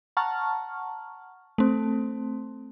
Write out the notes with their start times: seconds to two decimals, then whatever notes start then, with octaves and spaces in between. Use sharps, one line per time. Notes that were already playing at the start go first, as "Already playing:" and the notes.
0.17 F#5 A5 A#5 C#6 F6
1.58 A3 C4